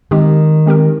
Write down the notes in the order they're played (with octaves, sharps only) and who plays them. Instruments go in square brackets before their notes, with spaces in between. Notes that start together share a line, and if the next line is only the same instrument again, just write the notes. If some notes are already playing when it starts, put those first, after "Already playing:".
[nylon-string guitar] D#3 [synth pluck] G#3 C4 G4 A#4
[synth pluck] G#3 C4 G4 A#4